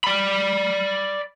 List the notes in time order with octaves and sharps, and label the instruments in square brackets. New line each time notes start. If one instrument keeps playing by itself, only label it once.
[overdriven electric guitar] D5 B5